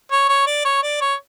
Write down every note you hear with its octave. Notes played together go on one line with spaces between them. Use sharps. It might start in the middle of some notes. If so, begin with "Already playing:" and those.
C#5
C#5
D5
C#5
D5
C#5